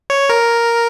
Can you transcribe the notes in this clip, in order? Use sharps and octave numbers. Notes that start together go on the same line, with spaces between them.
C#5
A#4